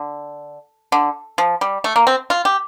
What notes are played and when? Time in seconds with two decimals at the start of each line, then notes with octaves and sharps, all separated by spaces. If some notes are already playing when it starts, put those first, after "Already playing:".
Already playing: D3
0.92 D3
1.38 F3
1.61 G3
1.84 A3
1.96 A#3
2.07 C4
2.30 F4
2.45 G4